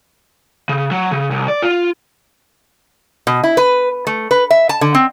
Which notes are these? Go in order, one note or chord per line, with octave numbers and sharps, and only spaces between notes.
C#3
F#3
C#3
C2
D5
F4
B2
E4
B4
A3
B4
E5
A5
D3
C4